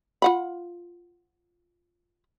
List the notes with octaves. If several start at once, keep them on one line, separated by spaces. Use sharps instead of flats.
F4 F#5 B5